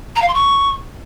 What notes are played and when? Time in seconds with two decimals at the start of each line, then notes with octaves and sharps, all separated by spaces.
0.16 A#5
0.22 F5
0.28 C6
0.34 C#6